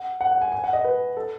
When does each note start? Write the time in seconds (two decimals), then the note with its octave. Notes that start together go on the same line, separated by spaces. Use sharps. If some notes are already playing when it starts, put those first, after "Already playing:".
Already playing: F#5
0.21 F#5
0.31 F#5
0.41 G#5
0.52 G#5
0.64 F#5
0.73 D#5
0.84 B4
1.17 A4